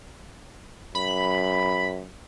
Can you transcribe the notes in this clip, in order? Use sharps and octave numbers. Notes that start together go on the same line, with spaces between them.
F#2 B5